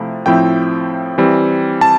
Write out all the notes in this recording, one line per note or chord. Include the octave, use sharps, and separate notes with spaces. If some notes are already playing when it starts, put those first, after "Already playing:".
Already playing: C3 F3 A3 E4
A2 F3 C4 E4 G5
E3 G3 C4
A5